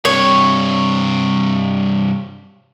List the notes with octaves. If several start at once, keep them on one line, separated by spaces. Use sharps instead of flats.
G2 C3 C#5